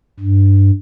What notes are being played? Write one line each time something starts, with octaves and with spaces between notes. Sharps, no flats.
G2